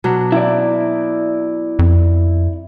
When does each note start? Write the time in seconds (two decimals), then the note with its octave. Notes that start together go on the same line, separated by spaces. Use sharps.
0.04 B2 F#3 D4
0.32 E4 D5
1.79 F2